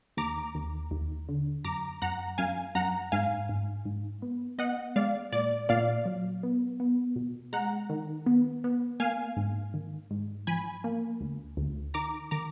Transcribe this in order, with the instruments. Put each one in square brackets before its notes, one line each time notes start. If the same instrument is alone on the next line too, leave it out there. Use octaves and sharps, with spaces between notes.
[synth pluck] D#2 A#5 D6
D#2
D#2
D3
F#2 A#5 D6
F#2 F#5 A#5
F#2 F5 G#5
F#2 F#5 A#5
G#2 F5 G#5
G#2
G#2
B3
B3 D#5 F#5
G#3 D5 F5
A#2 D5
A#2 D5 F5
F#3
B3
B3
B2
G#3 F#5 A#5
D#3
B3
B3
A#3 F5 G#5
G#2
D#3
G#2
F3 G#5 B5
A#3
D2
D2
D#3 A#5 D6
D#3 A#5 D6